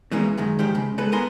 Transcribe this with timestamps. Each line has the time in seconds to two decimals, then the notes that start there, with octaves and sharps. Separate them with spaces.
0.11 B2 E3 G#3 A#3 C#4
0.38 F#2 D#3 G#3
0.59 G#2 D#3 F3 G#3 G4 C5
0.75 C#3 G#3
0.98 G#3 A4 B4
1.12 B3 A#4 G#5 A#5 C6